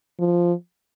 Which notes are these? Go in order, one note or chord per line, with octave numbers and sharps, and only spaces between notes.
F3